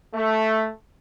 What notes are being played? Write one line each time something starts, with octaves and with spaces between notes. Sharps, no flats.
A3